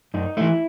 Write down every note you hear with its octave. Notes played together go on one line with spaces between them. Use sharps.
F#2 D#4
E3 A3 E4